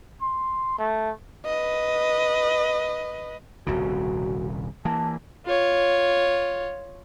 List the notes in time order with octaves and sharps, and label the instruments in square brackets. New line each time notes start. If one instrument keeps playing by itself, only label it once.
[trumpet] C6
A3
[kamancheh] B4 D#5
[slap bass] D#1 C2 C#3 [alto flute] F#4
[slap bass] E3 A#3 [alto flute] A5
[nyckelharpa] F4 C#5